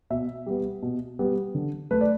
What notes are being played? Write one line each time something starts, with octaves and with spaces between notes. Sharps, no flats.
B2 E5
G3 B3
B2
G3 B3
D3
A3 B4
D5